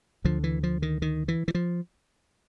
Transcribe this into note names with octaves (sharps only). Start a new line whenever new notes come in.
D2 D3 F3
E3
F3
D#3
D#3
E3
E3
F3